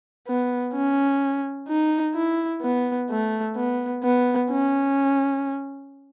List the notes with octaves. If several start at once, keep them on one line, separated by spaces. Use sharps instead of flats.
B3
C#4
D#4
E4
B3
A3
B3
B3
C#4